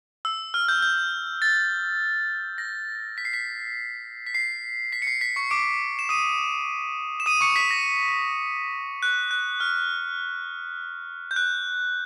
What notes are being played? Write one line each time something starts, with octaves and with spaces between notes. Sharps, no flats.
E6
F6
G6
G6
A6
A#6
B6
C7
B6
B6
C7
B6
C#7
C7
B6
C#6 C#7
D6 D7
E7
D#6 D#7
E7
D#6 D#7
C#6 C#7
B6
A#6
F#6
F#6
F6
G6
F#6